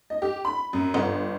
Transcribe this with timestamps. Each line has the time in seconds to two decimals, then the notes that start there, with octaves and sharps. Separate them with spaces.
0.10 D#5
0.22 G4
0.45 B5
0.73 F#2
0.94 G1